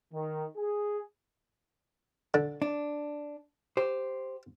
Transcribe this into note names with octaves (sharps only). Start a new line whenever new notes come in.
D#3
G#4
D3
D4
G4 C5